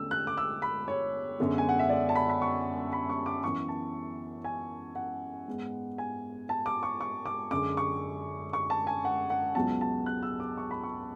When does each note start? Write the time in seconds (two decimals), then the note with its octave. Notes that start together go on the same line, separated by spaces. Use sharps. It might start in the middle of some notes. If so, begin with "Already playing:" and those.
Already playing: E2 D3 A3 C#4 E6
0.11 F#6
0.27 D6
0.38 E6
0.62 B5
0.88 C#5
1.40 F#2 D3 G#3 B3
1.58 G#5
1.69 F#5
1.79 E5
1.90 D5
2.09 A5
2.15 B5
2.29 B5
2.42 C#6
2.93 B5
3.09 C#6
3.26 D6
3.43 F#2 E3 B3 C#6
3.68 A5
4.44 G#5
4.95 F#5
5.48 G#2 G#3 B3
5.98 G#5
6.49 A5
6.66 D6
6.83 C#6
7.01 C#6
7.26 D6
7.51 F#2 D3 G#3 D6
7.77 C#6
8.53 C#6
8.70 A5
8.87 G#5
9.05 F#5
9.30 F#5
9.55 C#2 B2 F#3 B3 A5
9.81 A5
10.06 F#6
10.23 E6
10.40 D6
10.57 C#6
10.71 B5
10.83 C#6